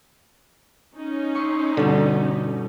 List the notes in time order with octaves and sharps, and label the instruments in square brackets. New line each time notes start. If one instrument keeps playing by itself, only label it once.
[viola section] C#4 D#4
[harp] E4 C6 C#6
[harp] G2 B2 [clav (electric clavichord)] D3